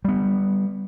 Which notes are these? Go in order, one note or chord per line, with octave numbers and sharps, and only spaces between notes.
G3 B3